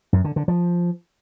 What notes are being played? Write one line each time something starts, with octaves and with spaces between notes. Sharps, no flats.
F#2
D3
D3
F3